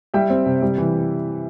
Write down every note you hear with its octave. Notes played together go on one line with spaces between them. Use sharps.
G3 E5 G5
C4
C3
G3
E3